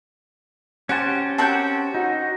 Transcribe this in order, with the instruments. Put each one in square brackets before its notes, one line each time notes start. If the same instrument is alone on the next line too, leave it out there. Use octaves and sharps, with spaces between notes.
[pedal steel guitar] C#4 G4 C5 [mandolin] F#4 G#5 A5
[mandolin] C4 C#5 G6 [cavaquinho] A#4 F#5 A5
[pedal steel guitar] D#4 [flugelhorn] F#4